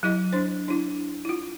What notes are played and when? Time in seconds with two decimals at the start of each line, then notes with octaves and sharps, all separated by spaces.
0.03 F#3 E4 D#5
0.33 D4 C5
0.68 D4 E4
1.25 E4 F4